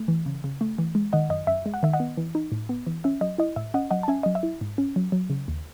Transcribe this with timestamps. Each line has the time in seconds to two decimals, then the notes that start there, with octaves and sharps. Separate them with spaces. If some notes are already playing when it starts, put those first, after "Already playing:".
Already playing: A3
0.08 E3
0.26 C#3
0.44 C#3
0.61 A3
0.78 E3
0.95 G#3
1.13 D#3 D#5 F#5
1.30 F#2 D#5
1.47 F#2 E5
1.66 G#3
1.74 F#5
1.83 D#3 E5
1.93 D#5 F#5
2.00 B3
2.17 E3
2.35 D#4
2.52 A2
2.69 B3
2.87 E3
3.04 C#4 E5
3.21 F#3 D#5
3.38 E4 D#5
3.56 A2 E5
3.74 C#4 D#5 F#5
3.91 F#3 D#5 F#5
4.03 A5
4.08 C#4 E5 G#5
4.23 F#3 D#5
4.35 E5
4.43 E4
4.61 G#2
4.78 C#4
4.96 F#3
5.12 F#3
5.30 C#3
5.48 D#2